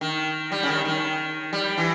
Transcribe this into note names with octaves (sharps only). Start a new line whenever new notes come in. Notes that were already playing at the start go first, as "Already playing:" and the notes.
D#3
G3
C#3
D#3
D#3
G3
E3